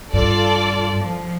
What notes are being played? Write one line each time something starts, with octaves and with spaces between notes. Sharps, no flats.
G2 F4 A4 D5
F3